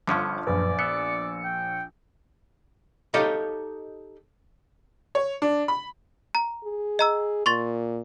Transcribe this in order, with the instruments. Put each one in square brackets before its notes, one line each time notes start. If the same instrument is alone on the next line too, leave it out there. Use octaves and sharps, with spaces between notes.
[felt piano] G1 F5 C#6 [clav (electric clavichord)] D3 F3 C#4
[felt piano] A#1 [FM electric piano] F#2 B4 [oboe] D5
[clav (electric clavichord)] B3 [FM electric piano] E6 C#7
[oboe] G5
[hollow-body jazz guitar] D#4 G4 A4 C#5 D#5 F5
[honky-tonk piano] C#5
D4
B5
[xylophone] A#5
[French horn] G#4
[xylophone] D#5 A#5 E6
[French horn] A#2 [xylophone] C6 C#6 A6